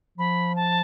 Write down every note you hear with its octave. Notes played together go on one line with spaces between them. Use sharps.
F3 B5
A5